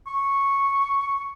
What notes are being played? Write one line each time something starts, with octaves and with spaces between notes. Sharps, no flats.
C#6